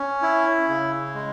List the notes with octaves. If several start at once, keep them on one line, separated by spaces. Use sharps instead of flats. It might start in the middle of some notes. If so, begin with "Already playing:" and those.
Already playing: C#4
E4
C#3
G#3